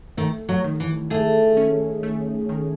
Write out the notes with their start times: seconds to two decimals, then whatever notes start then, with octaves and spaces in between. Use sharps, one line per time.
0.17 D#3 A3
0.49 F#3
0.64 D#3
0.80 E3
1.10 A3 G#4
1.57 C#4
2.03 A3
2.49 D#3